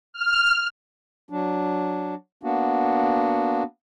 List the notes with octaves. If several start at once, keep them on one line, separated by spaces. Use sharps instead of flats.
F6
F#3 D4
A#3 B3 D4 F#4